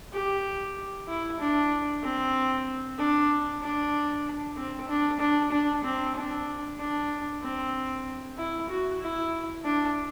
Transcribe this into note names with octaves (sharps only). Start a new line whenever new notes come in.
G4
E4
D4
C4
D4
D4
C4
D4
D4
D4
C4
D4
D4
C4
E4
F#4
E4
D4